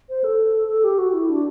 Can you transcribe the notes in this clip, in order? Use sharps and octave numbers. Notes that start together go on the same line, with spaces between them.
C5
A4
A4
G4
F#4
E4
D4